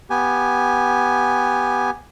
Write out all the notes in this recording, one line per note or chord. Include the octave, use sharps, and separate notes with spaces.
B3 G4 G#5